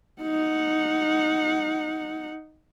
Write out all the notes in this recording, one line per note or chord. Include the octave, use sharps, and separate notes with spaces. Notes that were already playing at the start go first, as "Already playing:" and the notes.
D#4 F#5